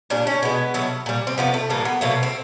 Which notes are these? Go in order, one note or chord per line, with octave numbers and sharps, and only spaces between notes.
A#2 G3 D4
C#4
B2 G#3 B3
B2 F#3 A3
A#2 G3
C4
C3 F3 A3 B3
A3
A2 E3 G3 A#3
B3
B2 F#3 A3 A#3
C4